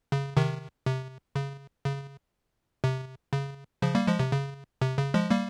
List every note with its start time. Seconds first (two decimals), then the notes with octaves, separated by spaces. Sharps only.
0.12 C#3
0.37 C3 D#3
0.86 C3
1.35 C#3
1.85 C#3
2.84 C3
3.33 C#3
3.82 C#3 F3
3.95 G3 A#3
4.07 F3 G#3
4.20 C3
4.32 C#3
4.81 C3
4.98 C#3
5.14 F3 G#3
5.30 G3 A#3